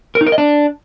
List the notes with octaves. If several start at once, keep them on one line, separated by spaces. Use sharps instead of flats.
A#4
D#4
A#4
D#5
D4